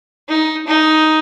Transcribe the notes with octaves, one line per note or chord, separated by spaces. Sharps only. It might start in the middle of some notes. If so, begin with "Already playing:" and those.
D#4
D#4